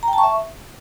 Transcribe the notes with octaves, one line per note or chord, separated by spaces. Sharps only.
A#5
G5
A5
C#6
E5